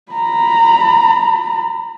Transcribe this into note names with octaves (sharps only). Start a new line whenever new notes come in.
A#5 B5